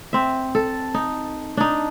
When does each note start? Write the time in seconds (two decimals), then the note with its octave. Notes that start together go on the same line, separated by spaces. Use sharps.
0.13 C4 E5
0.55 A4
0.94 D#4
1.57 D4 D#4